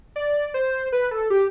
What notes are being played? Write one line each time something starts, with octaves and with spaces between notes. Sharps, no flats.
D5
C5
B4
A4
G4